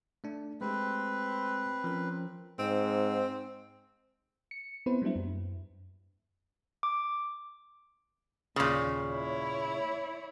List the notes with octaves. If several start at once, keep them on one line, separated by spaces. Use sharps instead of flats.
A3 D4
G#3 A3 C4 G4 B4
F3 C#4 A#4
G#2 C4
C#7
B3 C4 E4 B4 C5
F#3 G3 A#3 D4 E4
F#2
D6
D#2 A#2 C#3
E4 C#5